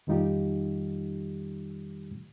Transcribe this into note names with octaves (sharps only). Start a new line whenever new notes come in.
F2 D#3 G3 D#4 F4 G4